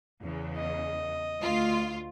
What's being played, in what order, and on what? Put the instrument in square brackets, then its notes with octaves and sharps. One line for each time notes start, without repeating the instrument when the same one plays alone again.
[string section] E2 C#3
[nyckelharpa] D#5
[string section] D2 F4